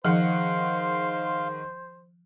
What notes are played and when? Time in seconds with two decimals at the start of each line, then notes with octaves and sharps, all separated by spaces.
0.05 D#3 F3 G#4 C5 F5 F#5 C6